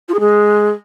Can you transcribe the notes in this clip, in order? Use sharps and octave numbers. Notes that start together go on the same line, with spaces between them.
F4
G#4
G#3